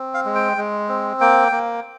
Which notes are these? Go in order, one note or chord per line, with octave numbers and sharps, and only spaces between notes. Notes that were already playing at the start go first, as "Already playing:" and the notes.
Already playing: C4
F5
G#3
G5
G#3
C4
A#3 G5
A#3